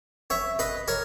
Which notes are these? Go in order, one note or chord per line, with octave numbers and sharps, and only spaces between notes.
C#5 E5
B4 D#5
A#4 C#5